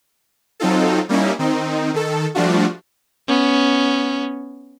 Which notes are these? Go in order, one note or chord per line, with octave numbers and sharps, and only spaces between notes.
F#3 C4 D#4 F4 A4
G3 A#3 C#4 D#4 E4
D#3 C4 D#4
D#3 A4
F3 G3 A3 D4 F4 F#4
B3 C#4